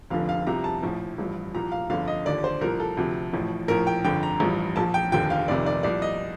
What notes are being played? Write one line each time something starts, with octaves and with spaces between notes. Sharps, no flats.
F1 F2 D3 F3 F5
F5
C2 C3 F3 A#5
A5
A#1 A2 F3
A1 G2 F3
C2 A#2 F3 A#5
F5
G1 F2 D3 F3 F5
D#5
D#2 D3 F3 D5
C5
C2 A#2 F3 A#4
A4
D2 C3 F3
A1 A2 F3
A#1 A2 F3 A#4
G5
G1 F2 D3 G5
A#5
A1 G2 F3
A#1 A#2 F3 A5
G5
F1 D#2 D3 F3 G5
F5
F1 F2 C3 D#3 D5
D5
C2 A#2 F3 D5
D#5